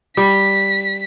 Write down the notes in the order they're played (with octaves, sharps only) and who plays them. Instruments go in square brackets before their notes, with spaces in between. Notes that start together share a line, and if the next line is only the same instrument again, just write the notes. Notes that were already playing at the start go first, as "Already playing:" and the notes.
[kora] G3 [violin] B6